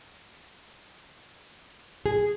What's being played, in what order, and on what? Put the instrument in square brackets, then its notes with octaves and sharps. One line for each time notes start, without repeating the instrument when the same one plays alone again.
[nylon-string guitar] G#4